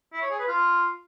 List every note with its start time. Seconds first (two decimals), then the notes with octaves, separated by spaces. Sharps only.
0.13 E4
0.22 C#5
0.30 G#4
0.39 B4
0.48 F4